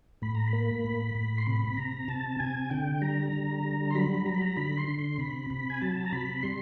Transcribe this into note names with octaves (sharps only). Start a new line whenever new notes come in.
A2 B5
A#5
B5
A#3
A2
A2
C6
C3 B5
C3 A#5
C3 A5
C3 G#5
D3 G5
G3 A#5
D3
G3
C6
F#3 B5
F#3 A#5
B5
A#5
D3 B5
C6
D3
C6
C3 B5
C3 B5
G#5
F#3 A5
A#5
C3 B5
G3 C6